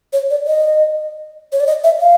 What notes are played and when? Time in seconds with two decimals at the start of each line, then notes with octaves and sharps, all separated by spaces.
0.13 C#5
0.30 D5
0.47 D#5
1.52 C#5
1.60 D5
1.67 D#5
1.84 E5
2.01 F5